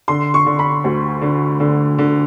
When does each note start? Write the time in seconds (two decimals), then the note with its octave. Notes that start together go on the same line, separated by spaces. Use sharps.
0.08 D3 C6
0.34 C#6
0.46 D3
0.59 B5
0.84 D2
1.22 D3
1.60 D3
1.99 D3